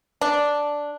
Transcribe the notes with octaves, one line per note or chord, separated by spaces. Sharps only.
D4